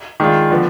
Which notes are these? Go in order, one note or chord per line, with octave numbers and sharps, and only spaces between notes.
D#3 G#3 D4 F4
D3 F3 B3